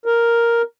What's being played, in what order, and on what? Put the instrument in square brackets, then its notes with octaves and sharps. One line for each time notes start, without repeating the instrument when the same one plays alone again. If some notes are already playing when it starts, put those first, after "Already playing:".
[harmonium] A#4